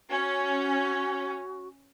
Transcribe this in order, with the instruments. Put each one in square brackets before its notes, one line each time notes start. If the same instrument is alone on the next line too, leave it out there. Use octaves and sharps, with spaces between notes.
[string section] C#4 [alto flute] F#4